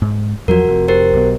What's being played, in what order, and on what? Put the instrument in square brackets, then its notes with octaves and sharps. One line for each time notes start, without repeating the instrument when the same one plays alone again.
[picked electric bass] G#2
[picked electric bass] E2 F3 F#3 [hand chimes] F#4 A#4
[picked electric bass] F1 F2
[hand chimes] G4 A#4 C5
[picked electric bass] B1 B2